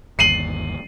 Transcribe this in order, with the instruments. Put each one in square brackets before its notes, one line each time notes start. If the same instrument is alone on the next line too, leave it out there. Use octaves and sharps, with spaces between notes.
[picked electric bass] G1 D#2 [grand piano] C7 D#7 F#7